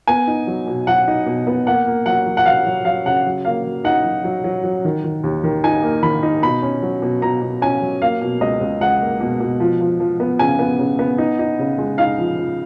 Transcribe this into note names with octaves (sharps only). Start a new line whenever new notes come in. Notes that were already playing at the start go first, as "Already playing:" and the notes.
B3 G#5
D#4
F#3
B2
F#3 F#5
D#4
B2
B3
A#3 F#5
A#3
F#3 F#5
F#3
F#5
F#3 F5
F#3
F#3 F5
C#3 F#5
F#3
A#3 F5
F#3
D#4 F#5
F#3
F#3
F#3
F#3
D#3
D#3
D#2
D#3
D#4 G#5
A#3
D#3 B5
D#4
B2 B5
C#4
F#3
B2
B2 A#5
B2
C#4 G#5
F#3
A#3 F5
B2
C#2 D#5
C#2
C#2 F#5
A#3
B2
B2
F3
F3
F3
B3
C#3 G#5
B3
C#3
B3
D#4
D#4
C#3
G#3
D#4 F5
F3
F3